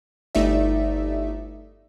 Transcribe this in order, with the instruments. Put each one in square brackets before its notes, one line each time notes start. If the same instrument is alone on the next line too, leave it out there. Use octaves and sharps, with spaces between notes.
[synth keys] G1 A3 D#4 D5 E5